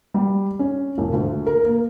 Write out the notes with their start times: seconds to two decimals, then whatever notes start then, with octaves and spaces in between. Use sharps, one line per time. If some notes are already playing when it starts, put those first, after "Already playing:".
0.14 G3
0.59 C#4
0.98 E1
1.13 D2
1.46 A#4
1.65 A#3